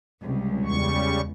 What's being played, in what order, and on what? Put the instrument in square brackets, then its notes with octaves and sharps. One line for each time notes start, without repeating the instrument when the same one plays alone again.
[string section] C#2 [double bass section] C3 G3
[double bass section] E2 [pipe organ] C#3 G3 C#6